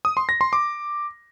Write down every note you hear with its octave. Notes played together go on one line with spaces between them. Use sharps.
D#6
C6
A#6
C6
D6